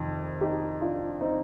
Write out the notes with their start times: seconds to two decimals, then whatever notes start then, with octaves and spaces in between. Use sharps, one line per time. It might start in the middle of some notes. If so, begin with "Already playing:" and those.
Already playing: F2 C3 D#3
0.41 D#4 G4
0.81 D4 F4
1.21 C4 D#4